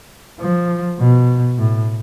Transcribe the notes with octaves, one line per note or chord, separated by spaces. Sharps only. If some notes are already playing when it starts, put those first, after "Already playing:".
F3
B2
A2